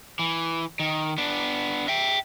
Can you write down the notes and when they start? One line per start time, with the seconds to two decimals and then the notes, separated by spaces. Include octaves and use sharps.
0.19 E3
0.80 D#3
1.18 B3 D4
1.88 E5 G5